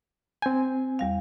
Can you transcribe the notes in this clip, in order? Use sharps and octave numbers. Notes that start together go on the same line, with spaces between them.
C4 G#5 G6
E2 G3 F5